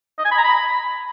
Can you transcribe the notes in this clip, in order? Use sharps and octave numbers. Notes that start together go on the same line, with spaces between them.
D#5
G#5
B5
A#5
B5